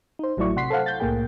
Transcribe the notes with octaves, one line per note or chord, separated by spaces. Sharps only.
D#4 C5
A1 F#3 A3 E4 D5 C#6
C3 F#5 C6 B6 C7
A4 C5 F5 F#5
G6 A6
C2 A2 A#3 G#4 G5